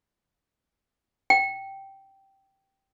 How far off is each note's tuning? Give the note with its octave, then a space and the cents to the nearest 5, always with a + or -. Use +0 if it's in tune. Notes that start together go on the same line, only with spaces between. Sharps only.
G5 -10